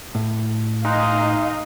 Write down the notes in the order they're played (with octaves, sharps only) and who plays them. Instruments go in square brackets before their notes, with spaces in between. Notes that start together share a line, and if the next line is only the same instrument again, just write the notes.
[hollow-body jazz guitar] A2
[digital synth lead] D#4 [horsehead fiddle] D#5 F5 [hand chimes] G#5 C6 F#6